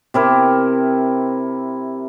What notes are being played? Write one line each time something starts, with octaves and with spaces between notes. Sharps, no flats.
C3 E4 A#4